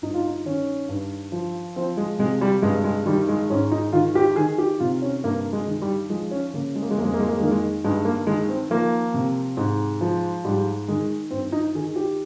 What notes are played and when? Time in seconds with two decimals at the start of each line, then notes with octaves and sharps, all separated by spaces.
0.02 G2 D#4
0.14 F4
0.27 D#4
0.45 D#3 C#4
0.89 G2
1.32 F3
1.76 F3 C4
1.97 G#3
2.19 C3 G#3
2.41 G3
2.62 G2 G#3
2.84 G#3
3.06 D#3 G3
3.29 G#3
3.50 G#2 C#4
3.72 D#4
3.92 D#3 F4
4.15 G4
4.36 D#3 G#4
4.58 G4
4.80 C3 F4
5.02 C#4
5.24 G2 A#3
5.53 G#3
5.67 D#3
5.82 G3
6.10 F3 G#3
6.31 C#4
6.53 C#3 A#3
6.75 G#3
6.82 A#3
6.91 G#3
6.97 F2 A#3
7.05 G#3
7.14 A#3
7.20 G#3
7.29 A#3
7.36 G#3
7.40 D#3 A#3
7.51 G#3
7.84 G2 G#3
8.05 A#3
8.27 D#3 G#3
8.49 C4
8.70 F3 A#3
9.14 C3
9.57 G#2
10.01 F3
10.44 G#2 G3
10.88 D#3 G#3
11.31 G2 C4
11.52 D#4
11.75 D#3 G#4
11.96 G4